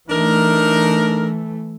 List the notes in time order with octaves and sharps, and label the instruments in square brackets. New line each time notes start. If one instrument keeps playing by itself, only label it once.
[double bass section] E3 A3 [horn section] D4 D#4 A#4